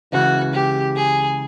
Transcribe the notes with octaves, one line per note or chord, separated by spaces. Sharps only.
C#2 C#3 E3 F#4
G4
G#4